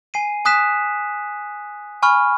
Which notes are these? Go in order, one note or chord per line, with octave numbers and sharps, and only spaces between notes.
G#5 C7 D#7
G#5 D#6 F#6 B6 E7
G#5 B5 C#6 F6